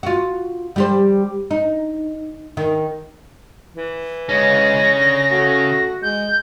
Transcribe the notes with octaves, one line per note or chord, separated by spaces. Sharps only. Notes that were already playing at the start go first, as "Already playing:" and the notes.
F4 F#4
G3 G4 C5
D#4
D#3
E3
C#3 G#3 C#4 A#6
D3
A3 F#4
G#3 G6